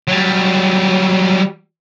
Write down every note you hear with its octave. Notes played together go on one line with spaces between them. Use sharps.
F#3 G3